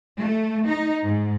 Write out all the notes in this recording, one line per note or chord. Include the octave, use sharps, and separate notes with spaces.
A3
D#4
G#2